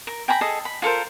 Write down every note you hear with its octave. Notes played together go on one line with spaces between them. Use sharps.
A#4
G5 G#5 A#5 B5
G#4 A4 D#5 A5
B5
F4 A4 A#4 C5